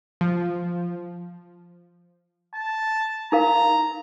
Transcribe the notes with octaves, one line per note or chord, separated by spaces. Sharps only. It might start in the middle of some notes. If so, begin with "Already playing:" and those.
F3
A5
D#4 A#4 F5 A#5